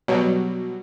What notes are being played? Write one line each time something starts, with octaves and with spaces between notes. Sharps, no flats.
B2 F#3 G3